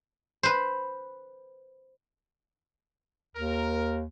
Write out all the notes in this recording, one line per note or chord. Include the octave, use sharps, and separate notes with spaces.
B4 C5
D#2 A#4